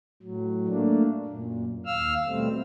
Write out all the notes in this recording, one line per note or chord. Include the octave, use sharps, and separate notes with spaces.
A2 F#3
A3 A#3 D4
F#2 A#2
D#2 F5 E6 F6
B2 G3 A3 C4